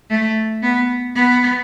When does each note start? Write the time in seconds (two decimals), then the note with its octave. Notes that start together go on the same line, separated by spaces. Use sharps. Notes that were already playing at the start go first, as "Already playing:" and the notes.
0.10 A3
0.62 B3
1.15 B3